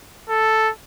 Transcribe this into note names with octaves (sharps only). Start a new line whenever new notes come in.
A4